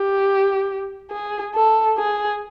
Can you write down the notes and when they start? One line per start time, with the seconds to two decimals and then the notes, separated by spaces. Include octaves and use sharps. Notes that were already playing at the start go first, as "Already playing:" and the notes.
Already playing: G4
1.11 G#4
1.54 A4
1.98 G#4